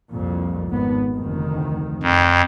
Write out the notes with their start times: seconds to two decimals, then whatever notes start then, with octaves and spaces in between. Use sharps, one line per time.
0.12 C2 F2 A#2
0.68 G#1 B3
1.13 F1 D2 D#3
2.03 F2